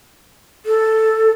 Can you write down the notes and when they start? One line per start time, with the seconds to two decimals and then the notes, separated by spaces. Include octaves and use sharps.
0.66 A4